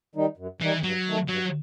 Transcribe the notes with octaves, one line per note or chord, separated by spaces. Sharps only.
D#3 G3 D#4
F#2
D#3 E3 G3 D#4
G2 F#3
D#3 A3
G2 F#3